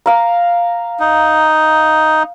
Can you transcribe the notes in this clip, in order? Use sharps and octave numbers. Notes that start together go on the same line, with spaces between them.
F5 A#5
D#4